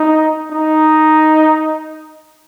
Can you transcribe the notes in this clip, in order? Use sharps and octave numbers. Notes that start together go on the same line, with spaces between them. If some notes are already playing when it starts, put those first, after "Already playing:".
Already playing: D#4
D#4